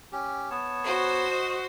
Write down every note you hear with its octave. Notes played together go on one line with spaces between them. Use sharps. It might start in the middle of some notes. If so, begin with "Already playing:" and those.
C#4 G4
B3 C#5 A5
F#4 C5
D#5